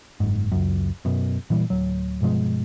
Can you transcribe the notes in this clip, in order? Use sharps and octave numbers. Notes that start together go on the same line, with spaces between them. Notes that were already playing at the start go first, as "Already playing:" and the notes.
F#1 G#2
C#2 F#2
F#2 B2
A#2 E3 G3
D1 F#3
G2 B2 F3 G#3